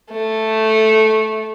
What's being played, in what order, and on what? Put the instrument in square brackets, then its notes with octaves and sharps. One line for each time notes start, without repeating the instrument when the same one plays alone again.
[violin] A3